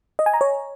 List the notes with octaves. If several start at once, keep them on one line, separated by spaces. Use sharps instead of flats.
D#5
G#5
A#5
C#5